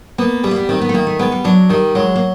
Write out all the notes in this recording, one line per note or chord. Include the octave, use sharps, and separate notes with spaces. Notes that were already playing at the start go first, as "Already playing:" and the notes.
A#3 B3
G3 A3
A#3
B3
D#3 C4
B3
A3
D#3 A#3
A3
G#3 B3
G3
F#3 D4
D#3 G3
F#3 G#3
A#3